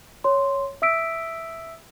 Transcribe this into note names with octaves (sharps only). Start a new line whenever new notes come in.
C#5 C6
E5 D#6 E6 B6 D7